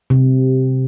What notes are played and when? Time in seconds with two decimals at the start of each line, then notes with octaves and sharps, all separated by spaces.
0.10 C3